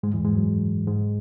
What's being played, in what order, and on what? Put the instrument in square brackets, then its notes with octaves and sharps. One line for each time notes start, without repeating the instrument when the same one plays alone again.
[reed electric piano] G#2 G#3
E2 E3
G#2 G#3
F#2 F#3
G#2 G#3